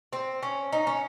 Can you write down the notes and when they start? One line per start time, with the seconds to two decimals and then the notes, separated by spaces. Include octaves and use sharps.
0.13 C4
0.43 C#4
0.72 D#4
0.87 C#4